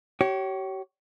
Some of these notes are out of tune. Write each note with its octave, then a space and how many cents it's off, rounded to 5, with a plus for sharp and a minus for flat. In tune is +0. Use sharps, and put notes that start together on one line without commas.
G4 -40 C#5 +0